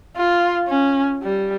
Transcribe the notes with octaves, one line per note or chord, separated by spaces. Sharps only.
F4
C#4
G3